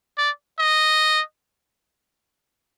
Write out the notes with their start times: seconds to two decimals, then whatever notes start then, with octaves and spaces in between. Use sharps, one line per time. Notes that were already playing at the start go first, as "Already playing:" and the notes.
0.18 D5
0.59 D#5